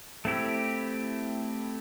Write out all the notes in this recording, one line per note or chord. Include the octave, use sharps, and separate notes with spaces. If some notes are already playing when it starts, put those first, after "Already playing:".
A3 C4 E4 G4